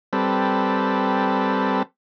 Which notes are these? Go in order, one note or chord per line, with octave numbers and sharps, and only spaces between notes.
G3 C4 A4 B4